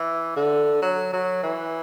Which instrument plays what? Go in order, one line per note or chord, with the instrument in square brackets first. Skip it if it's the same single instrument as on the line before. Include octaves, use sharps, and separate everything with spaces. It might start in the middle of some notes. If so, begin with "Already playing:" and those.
Already playing: [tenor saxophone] E3
D3
F#3
F#3
E3